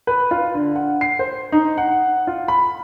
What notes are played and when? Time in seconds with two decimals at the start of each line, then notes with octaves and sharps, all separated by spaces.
0.07 B4
0.31 F4
0.54 D3
0.75 F#5
1.01 C7
1.19 C5
1.52 D#4
1.78 F#5
2.27 F4
2.48 B5